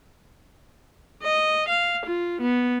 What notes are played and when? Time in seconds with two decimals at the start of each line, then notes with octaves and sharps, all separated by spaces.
1.23 D#5
1.69 F5
2.06 F4
2.41 B3